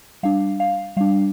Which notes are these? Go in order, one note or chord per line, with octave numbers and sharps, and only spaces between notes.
G3 D4 F5
F5
G3 D4 F5